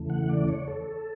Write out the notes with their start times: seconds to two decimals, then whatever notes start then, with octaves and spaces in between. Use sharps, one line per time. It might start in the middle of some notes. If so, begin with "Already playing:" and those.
Already playing: E2 C#3 E3 A3
0.10 F#5
0.29 D5
0.48 C#5
0.68 A4